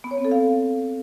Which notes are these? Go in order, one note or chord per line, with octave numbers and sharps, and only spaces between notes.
B3
C#5
C4
A4
F5